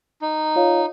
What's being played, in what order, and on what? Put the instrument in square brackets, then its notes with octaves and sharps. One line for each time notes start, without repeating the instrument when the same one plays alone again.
[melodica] D#4
[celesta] F4 C#5 F5